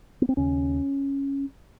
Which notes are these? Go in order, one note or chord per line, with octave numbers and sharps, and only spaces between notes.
B3
C4
D#2 C#3 C#4